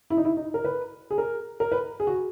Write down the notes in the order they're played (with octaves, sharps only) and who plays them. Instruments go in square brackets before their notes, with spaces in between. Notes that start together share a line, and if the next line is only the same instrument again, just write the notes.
[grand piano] E4
D#4
E4
D#4
A#4
B4
G#4
A#4
A#4
B4
G#4
F#4